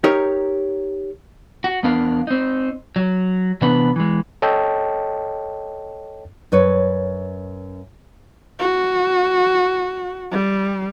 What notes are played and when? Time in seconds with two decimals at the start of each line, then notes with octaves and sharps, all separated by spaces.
0.04 D#4 G4 A#4 C#5
1.64 F#4
1.83 E2 B3 D4 A#4 F5
2.27 C4 D#4
2.96 F#3
3.61 C3 E3 B3 D4 B4
3.96 E3 G#3
4.42 A4 C#5 D#5 G5 A5
6.52 F#2 B4 C#5
8.59 F#4
10.32 G3